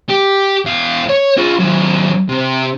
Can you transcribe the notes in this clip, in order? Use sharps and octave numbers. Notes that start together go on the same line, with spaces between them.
G4
E2 F5
C#5
F4 G#4
D#2 F#3
C3